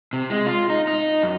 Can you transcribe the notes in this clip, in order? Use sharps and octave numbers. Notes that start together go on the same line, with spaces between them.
C3
G#3
F4
D#4
D#4
F#2